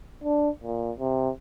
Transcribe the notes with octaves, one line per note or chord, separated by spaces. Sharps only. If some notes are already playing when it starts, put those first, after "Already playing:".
D4
A#2
C3